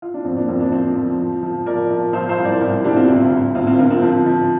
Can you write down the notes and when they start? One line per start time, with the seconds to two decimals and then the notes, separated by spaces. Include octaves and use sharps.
0.02 F4
0.14 D4
0.24 F2 C4
0.36 A#3 D4
0.48 F2 C4 F4
0.60 A#3 D4
0.72 F3 C4 F4
0.95 F3
1.19 F3
1.43 F3
1.66 F3 A#4 D5
1.90 F3
2.13 F3 C5 F5
2.29 C5 F5
2.37 C2
2.45 A#4 D5
2.61 C2
2.84 C2 D4 G4
2.96 C4 F4
3.08 D2
3.32 D2
3.55 D2 C4 F4
3.67 C4 F4
3.79 D3 F4 A#4
3.90 C4 F4
4.02 F3 C4
4.26 F3